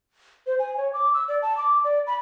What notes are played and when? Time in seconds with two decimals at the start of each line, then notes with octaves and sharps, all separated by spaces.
0.47 C5
0.59 G#5
0.77 C#5
0.93 D6
1.14 E6
1.28 D5
1.42 A5
1.57 D6
1.84 D5
2.07 B5